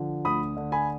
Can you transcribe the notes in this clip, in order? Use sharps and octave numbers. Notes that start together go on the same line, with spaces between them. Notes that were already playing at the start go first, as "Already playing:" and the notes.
Already playing: D3 F3
D2 B5 D#6
D3
G#5 B5